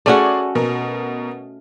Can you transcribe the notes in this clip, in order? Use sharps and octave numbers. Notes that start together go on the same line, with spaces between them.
A3 C#4 F#4 G#4 D5
B2 A#4